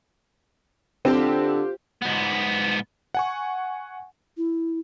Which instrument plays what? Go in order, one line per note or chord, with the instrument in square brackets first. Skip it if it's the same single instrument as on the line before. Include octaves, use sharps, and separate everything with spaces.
[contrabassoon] D3 [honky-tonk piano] C4 [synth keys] F4 G4 C5
[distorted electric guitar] G#2 B3
[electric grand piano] F#5 G#5 C#6
[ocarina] E4